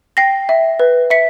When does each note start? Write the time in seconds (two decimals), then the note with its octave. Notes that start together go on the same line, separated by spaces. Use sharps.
0.17 G5 A#6 C7
0.49 E5
0.80 B4
1.10 E5 B6 C#7